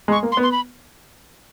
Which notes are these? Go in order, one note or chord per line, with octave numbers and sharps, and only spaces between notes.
G#3
C#6
A#3
C6
B3
C6
B5